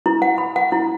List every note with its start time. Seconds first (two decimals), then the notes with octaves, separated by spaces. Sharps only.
0.06 E4
0.22 F#5
0.38 B5
0.56 F#5
0.72 E4